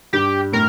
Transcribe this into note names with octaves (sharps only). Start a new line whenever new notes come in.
G2 G4
A2 A#4